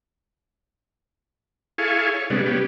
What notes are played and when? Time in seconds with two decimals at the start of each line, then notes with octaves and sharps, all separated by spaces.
1.78 E4 G#4 A4 F5 G#5 C#6
2.14 C#5
2.30 C3 G3 G#3 B3 D4
2.46 B3 C#4 G4